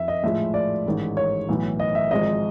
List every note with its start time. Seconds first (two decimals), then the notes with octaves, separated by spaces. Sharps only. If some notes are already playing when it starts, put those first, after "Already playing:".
Already playing: F2 E5
0.08 D#5
0.23 A#1 A2 F3 G#3 E5
0.54 D5
0.86 A1 G#2 D#3
1.17 C#5
1.49 B1 A2 E3
1.80 D#5
1.95 E5
2.11 G#1 G#2 F3 G#3 D#5